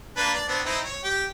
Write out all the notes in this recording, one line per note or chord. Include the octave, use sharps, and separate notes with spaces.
A#3 D4 B4
D5
B3 C4 D4
C4 D#4 E4
C#5
G4